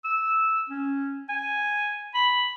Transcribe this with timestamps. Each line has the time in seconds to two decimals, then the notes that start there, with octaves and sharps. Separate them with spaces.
0.04 E6
0.69 C#4
1.29 G#5
2.14 B5